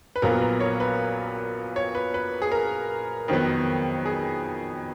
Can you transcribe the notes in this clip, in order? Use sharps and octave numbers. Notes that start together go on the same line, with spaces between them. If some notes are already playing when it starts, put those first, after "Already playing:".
B4
A#1 A#2 F#3 B3 A#4
B4
C#5
B4
C#5
B4
B4
G#4
A#4
F2 D#3 F#3 B3
G#4